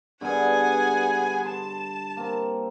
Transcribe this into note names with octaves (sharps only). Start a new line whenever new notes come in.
G2 D3 B3 G#4 F#5 G#5
A5 C6
A#3 C4